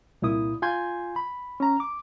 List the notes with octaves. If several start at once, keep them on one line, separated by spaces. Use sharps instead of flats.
C2 A#2 E4 D#6
F4 G#5 C6 G6 G#6
B5
C#4 A#5
D6